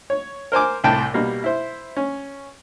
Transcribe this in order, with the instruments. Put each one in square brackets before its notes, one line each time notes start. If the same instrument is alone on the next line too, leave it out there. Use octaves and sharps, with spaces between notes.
[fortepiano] C#5
A#4 C5 G#5 D6
C2 A2 G5 A5
B2 G3 A#3
E4 C5
C#4